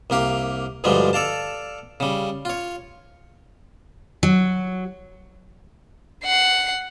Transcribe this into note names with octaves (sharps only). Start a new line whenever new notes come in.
C2 A#3 G4 F5
D2 G2 F3 G3 G#3 D4
A4 D5 F5 A5
C#3 G3
F4 C#5
F#3
F#5 C7